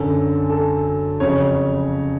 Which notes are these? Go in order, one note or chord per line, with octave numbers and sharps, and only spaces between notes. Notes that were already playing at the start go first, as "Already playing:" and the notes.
Already playing: F#2 D3 F#3 A4
A4
F2 C#3 F#3 C#5